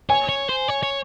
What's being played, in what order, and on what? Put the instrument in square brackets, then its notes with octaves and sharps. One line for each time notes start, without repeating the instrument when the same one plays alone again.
[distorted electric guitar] C#5 [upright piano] G#5
[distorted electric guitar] C#5
C5
C#5
C#5